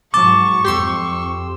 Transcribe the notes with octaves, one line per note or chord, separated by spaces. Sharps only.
G#2 F#3 A5 C#6 D6
F2 G4 C6 E6